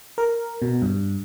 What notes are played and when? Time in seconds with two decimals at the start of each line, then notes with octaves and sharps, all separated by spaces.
0.18 A#4
0.62 B2
0.82 G2